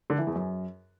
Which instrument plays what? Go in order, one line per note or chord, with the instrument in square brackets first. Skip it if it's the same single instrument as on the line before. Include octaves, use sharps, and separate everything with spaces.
[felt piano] D3
E3
E2
F#2